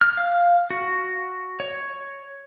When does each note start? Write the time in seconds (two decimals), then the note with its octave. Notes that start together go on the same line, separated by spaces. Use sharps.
0.01 F6
0.17 F5
0.70 F#4
1.60 C#5